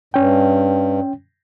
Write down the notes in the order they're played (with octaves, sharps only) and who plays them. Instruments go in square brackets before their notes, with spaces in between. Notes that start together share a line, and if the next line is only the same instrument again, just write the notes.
[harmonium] G2 [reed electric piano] C#4 G5